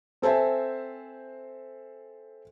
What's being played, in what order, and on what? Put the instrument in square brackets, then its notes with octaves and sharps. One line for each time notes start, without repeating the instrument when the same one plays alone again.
[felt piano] C4 A4 C5 E5 G#5